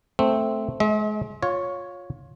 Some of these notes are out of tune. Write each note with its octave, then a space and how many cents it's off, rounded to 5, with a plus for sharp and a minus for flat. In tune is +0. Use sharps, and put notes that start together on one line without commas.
A3 +0 C4 +0
G#3 +35 E5 -45
F4 +25 C#5 +0